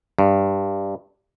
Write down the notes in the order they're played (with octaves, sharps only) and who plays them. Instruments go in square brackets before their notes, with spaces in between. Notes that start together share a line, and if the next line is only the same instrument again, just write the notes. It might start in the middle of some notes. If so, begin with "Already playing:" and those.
[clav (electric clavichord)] G2